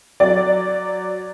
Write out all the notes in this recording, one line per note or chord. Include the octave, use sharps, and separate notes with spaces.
F#3 D5